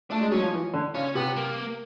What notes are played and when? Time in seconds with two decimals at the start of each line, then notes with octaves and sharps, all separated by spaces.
0.11 A3 D4
0.21 G#3
0.31 F#3 C#4
0.42 F3
0.53 E3
0.73 D3
0.95 C#3 C#4
1.15 C3 B3
1.36 A#3